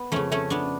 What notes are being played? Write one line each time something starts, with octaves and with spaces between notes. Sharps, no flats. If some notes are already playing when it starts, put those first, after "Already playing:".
Already playing: B3
F2 C#3 A3 C#4
A3 C#4
B3 D4